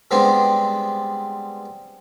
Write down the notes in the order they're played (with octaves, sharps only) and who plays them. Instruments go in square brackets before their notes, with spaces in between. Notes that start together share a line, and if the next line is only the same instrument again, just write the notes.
[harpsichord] G3 G#3 B3 C4 D4